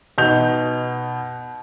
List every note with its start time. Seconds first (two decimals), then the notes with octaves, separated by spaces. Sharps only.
0.18 B2 D#4 G6 F7